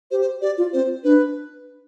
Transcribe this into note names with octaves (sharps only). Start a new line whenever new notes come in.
G4 C5
C5
G4 D5
F4
C4 C5
D4 B4